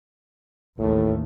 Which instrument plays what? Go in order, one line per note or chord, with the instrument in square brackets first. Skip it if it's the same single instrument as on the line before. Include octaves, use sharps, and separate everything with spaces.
[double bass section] A1 D#2 A3 [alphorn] A2